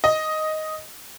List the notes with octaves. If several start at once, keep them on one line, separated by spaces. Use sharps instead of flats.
D#5